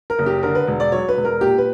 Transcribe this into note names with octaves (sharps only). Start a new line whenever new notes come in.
A#4
F#1
G4
D3 A#4
B4
E1
D5
F#3 C#5
B4
E1
A#4
A#2 G4
B4